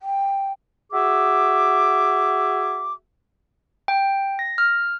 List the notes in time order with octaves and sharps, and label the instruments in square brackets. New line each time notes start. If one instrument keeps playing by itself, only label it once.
[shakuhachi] G5
[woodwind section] F#4 G#4 E5 D6
[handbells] G5
A#6
F6